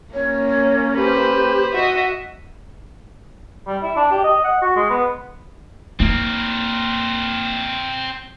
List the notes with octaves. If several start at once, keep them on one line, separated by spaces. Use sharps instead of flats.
A#3 C#4 C#5
G4 B4 C5
F#4 D#5 E5 F#5
G3
E4
D4
G4
D#5
F#5
F#4
G#3
B3
A#3 C4 A#4